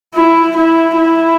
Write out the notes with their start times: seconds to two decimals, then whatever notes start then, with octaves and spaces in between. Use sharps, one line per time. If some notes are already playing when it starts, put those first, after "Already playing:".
0.14 E4
0.56 E4
0.97 E4